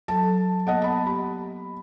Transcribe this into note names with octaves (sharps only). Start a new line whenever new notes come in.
F#3 A4 A5
A#3 B3 D#5 F#5 A5
A5 B5
G4 B5